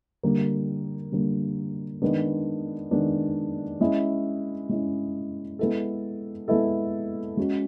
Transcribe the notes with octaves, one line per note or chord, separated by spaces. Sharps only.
D3 G3 A#3
D3 G3 A#3
D#3 G#3 B3 D4
D#3 G#3 B3 D4
G#3 C#4 E4
G#3 C#4 E4
G#3 B3 E4 A4
G#3 B3 E4 A4
G#3 C#4 F#4